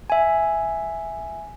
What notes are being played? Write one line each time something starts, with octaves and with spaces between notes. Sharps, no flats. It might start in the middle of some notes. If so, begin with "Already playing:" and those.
E5 G#5